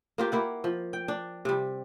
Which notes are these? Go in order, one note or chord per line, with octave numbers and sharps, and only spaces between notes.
A#3 F4 G4
A#3 E4 F#5
F3
G5
D4
C3 G3